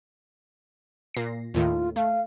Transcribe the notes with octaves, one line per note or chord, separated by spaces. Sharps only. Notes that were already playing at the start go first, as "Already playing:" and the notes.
A#2 A#6 C7
D#2 A2 D#3 F4
A3 F5